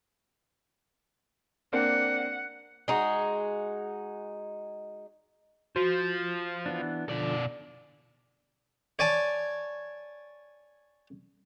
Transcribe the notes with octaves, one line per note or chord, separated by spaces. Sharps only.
A#3 C4 D4 F#5
G#3 D#4 F#4
F3 F#4 C5
E3 B3 D4
B2 D3 F3 D5
C#5 D5 G#5 A5